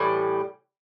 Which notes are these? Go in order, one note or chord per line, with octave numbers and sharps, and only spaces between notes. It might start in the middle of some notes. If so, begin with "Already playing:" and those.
Already playing: A2 E3 G3